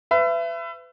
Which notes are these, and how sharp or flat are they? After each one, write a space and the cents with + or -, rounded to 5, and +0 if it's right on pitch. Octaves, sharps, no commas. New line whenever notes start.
B4 +30 E5 +30